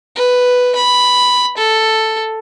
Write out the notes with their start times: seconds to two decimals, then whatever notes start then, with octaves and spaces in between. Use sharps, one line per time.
0.16 B4
0.75 B5
1.57 A4